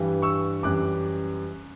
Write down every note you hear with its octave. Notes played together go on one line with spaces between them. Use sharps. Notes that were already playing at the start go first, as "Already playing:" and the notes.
Already playing: G2 E3 G3
C#6 E6
F#2 E3 G3 D6 F#6